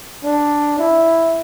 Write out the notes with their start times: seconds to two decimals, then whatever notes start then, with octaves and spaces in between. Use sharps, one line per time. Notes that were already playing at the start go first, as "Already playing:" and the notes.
0.24 D4
0.79 E4